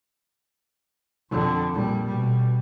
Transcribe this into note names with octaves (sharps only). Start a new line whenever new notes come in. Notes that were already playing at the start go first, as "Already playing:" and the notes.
F2 D3
A#1 G3
B2 G3